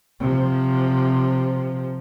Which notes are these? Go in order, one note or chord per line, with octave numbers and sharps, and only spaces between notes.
C3 F3